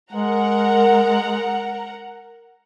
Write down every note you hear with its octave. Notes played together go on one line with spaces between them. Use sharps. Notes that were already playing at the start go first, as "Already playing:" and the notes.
G#3 A#4 F#5 A#5